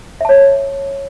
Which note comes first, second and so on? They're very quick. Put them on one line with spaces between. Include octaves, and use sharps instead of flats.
E5 A5 C#5